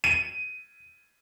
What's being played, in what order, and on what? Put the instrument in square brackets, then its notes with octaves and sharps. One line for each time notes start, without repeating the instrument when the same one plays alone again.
[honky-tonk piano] D#7